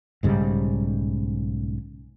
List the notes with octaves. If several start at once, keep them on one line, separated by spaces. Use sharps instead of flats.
B1 G#2 C#3 G3